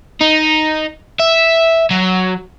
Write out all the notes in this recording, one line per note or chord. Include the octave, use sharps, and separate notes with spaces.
D#4
E5
F#3